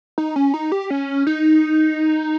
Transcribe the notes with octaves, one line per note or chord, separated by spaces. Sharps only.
D#4
C#4
D#4
G4
C#4
D#4